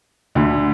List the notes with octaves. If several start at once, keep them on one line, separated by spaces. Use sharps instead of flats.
D2 D3